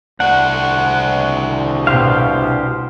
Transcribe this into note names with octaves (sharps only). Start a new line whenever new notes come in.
C2 D4 F#4 F#5
B2 G4 C5 F5